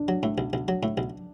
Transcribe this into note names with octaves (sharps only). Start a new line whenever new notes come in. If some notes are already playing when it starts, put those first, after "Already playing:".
Already playing: D4
F#3
A2
B1
B1
F#3
A2
B1